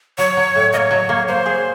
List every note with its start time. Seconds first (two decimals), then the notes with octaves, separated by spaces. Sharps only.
0.18 F#3 C#5
0.37 F#3
0.55 A2
0.73 A#3 C#5 D#5
0.91 F#3
1.09 A#3
1.28 A#3 C5
1.46 G#4